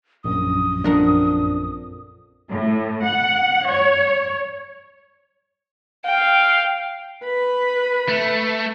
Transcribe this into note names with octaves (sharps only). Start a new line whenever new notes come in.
A#1 F#2 D#6
F2 D4 A#4 F#5
A2
F#5
C#5
F5 G5
B4 B5
A3